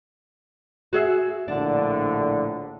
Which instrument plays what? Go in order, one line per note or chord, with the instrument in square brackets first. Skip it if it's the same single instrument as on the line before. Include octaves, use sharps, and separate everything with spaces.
[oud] F#4 G#4 E5
[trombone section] A#1 A2 D3 [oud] D4